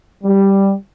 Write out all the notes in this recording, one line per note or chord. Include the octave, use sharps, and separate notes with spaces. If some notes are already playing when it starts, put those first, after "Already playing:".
G3